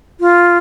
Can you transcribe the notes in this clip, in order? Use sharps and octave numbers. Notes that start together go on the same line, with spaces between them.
F4